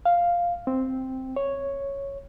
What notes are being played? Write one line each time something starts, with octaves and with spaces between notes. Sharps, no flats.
F5
C4
C#5